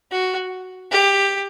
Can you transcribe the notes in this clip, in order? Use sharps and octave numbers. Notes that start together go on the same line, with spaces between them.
F#4
G4